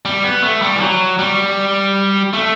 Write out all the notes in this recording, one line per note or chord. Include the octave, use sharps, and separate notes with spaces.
G3
B3
A3
G3
E3
F#3
G3
A3